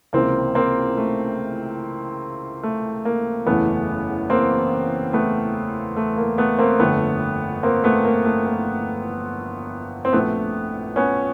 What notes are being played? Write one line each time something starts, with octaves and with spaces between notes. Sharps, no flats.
C#2 C3 E3 A#3 C4
A#3 C4
A3
A3
A#3
F#1 E2 C#3 E3 A3 B3
A#3 C4
A3 B3
A3
A#3
A3 B3
A#3 C4
G1 F2 D3 A3 B3
A#3 C4
A3 B3
A#3
A3
A#3
C4
A#1 A#2 A3 B3
B3 C#4